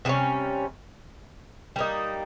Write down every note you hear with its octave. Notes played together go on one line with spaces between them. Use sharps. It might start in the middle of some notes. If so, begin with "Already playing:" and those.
C3 G3 A#3 C#4
G3 A#3 D#4